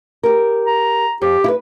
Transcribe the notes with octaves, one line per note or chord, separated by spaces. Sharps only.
G4 A#4
A#5
F2 G4
E4 B4